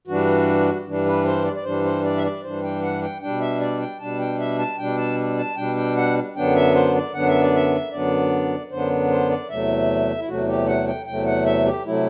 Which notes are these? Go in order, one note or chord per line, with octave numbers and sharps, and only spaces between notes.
G2 E3 G3 D4 F#4
G2 E3 G3 D4
B4
C5
D5
D5
G2 E3 G3 D4 C5
C5
D5
E5
D5
G2 E3 G3 D4 C5
G5
F#5
G5
B2 G3 D4 G5
E5
D5
G5
B2 G3 D4 A5
G5
E5
A5
B2 G3 D4 G5
A5
A5
B2 G3 D4 G5
G5
F#5
F#2 D3 F#3 B3 D4 G5
E5
C5
D5
F#2 D3 F#3 B3 D4 F#5
E5
D5
E5
F#2 D3 F#3 B3 D4 D5
F#2 D3 F#3 B3 D4 C5
C5
D5
E2 C3 F#3 A3 E5
E4
E2 C3 F#3 A3 F#4
G4
F#5
G5
E2 C3 F#3 A3 G5
F#5
E5
G4
C3 F#3 A3 E4